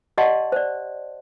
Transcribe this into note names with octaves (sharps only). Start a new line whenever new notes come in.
G4 D5 D#5 F#5 A5 C6
C5 D5